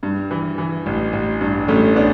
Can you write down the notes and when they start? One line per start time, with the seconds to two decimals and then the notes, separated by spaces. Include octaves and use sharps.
0.03 G2
0.31 E3
0.58 E3
0.86 A1
1.13 A1
1.41 G2
1.68 A1 A3 C#4
1.96 B3 D4